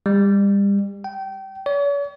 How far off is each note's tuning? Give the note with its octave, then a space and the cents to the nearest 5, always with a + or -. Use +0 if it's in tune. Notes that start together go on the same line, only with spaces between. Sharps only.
G3 +35
G5 -25
C#5 +45